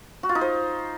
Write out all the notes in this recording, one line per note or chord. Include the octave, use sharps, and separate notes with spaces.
F#4
F4
D#4
C5